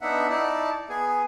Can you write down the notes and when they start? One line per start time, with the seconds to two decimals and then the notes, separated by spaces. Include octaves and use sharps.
0.01 B3 D4 D#4 E5 F#5
0.30 D#4 E4 D5 A5
0.89 B3 G#4 G#5